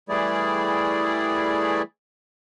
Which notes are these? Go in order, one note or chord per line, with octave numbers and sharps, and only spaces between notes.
E3 G3 A3 E4 G#4 D5